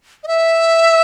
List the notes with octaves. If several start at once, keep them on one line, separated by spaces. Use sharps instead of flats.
D#5
E5